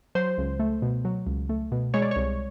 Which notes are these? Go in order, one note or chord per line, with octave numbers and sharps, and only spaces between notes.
F#3 C5
C#2
A3
B2
F#3
C#2
A3
B2
G#3 C#5
D5
C2 C#5